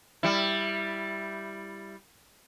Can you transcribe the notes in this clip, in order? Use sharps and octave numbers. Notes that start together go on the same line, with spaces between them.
G3 E4